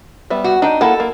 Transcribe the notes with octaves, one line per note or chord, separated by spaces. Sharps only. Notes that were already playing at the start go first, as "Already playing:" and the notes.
G3 B3 E5
F#4
D4 D#4 G5
A#3 E4 A4 F#5
A#3